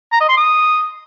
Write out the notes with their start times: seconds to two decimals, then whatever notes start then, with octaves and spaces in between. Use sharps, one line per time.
0.12 A#5
0.20 D#5
0.29 C6
0.37 D#6